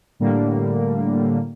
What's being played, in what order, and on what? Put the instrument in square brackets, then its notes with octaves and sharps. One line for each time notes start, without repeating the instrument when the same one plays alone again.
[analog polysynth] A2 D3 G3 A#3